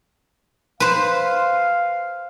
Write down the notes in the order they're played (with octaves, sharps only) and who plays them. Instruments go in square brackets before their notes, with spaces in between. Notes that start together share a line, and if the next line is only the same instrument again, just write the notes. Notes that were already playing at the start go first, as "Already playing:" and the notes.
[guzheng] B4 C5 [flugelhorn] F5